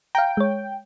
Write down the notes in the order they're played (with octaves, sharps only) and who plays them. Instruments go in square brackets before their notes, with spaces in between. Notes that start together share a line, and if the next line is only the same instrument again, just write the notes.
[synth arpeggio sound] F5 A#5 [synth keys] G5
[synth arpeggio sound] G#3 C#5